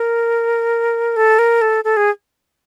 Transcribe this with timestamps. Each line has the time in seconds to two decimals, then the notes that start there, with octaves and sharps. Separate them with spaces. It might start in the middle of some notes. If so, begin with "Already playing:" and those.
Already playing: A#4
1.16 A4
1.39 A#4
1.62 A4
1.84 A4
1.97 G#4